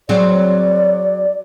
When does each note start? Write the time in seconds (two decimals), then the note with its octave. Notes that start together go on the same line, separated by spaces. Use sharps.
0.09 F#3 C4 G#4 D5